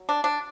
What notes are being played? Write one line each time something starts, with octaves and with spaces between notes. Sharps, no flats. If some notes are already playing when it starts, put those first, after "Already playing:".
Already playing: F#3
D4
D4